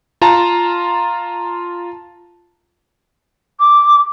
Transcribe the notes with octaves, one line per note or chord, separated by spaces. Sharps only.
F4 A5 A#5
D6